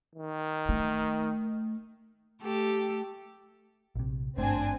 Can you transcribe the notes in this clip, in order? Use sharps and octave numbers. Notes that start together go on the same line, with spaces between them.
D#3
A3
A3 G4 A4
A#1 C3
G#1 G2 A3 C4 D4 G#5